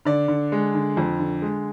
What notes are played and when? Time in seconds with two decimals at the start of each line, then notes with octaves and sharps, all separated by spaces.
0.05 D3 D5
0.28 D3
0.52 G#3
0.75 D3
0.97 F2
1.19 D3
1.42 G#3